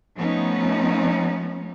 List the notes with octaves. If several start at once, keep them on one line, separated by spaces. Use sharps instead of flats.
F3 A3 B3 C#4 D#4